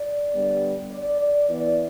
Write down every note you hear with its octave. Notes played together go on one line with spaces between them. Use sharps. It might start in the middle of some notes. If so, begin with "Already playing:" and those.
Already playing: D5
D3 G3 B3
D5
D5
E3 B3 D5